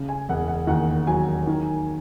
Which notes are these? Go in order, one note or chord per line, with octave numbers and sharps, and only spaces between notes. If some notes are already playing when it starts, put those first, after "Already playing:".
Already playing: C#3
G#5
E1 F#5
F#5
D#2 F#5
F#3 G#5
D#3